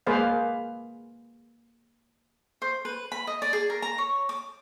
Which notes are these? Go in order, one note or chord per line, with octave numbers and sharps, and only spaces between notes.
G#3 A#3 G#4 B4 C5 F5
C5
B4
B5
D#5
D5
G#4
A#4
A#5
C#5
D6